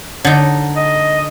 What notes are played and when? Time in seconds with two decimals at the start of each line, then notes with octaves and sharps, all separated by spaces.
0.25 D3 D#4
0.76 D#5